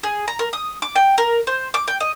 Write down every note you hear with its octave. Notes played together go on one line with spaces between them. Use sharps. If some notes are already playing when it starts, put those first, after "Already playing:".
G#4
A#5
A#4
D#6
D6
G5
A#4
C5
D6
G5
D#5